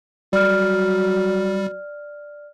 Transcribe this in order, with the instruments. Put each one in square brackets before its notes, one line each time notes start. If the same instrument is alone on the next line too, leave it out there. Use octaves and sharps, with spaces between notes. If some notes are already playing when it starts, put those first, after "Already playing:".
[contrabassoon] F#3 [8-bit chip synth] G3 [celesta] D5 F6